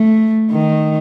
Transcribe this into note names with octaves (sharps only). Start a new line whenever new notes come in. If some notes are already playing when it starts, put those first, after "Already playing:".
Already playing: A3
D#3